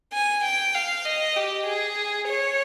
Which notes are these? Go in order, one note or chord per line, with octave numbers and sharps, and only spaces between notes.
G#5
G5
F5
D#5
G4
G#4
C#5